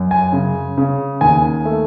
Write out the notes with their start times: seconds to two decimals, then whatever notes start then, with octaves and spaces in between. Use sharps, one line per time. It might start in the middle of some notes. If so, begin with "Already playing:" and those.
Already playing: F#2
0.11 G#5
0.33 C#3
0.78 C#3
1.21 D#2 G#5
1.65 A3